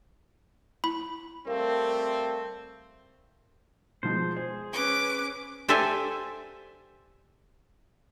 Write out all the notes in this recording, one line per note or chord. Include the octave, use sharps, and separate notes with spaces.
E4 B5
G3 A3 C4 A#4 F5
B2 F3 G#3 C5
G#4 C5
C#4 B4 D6
G4 A4 C5 D5 E5 G#5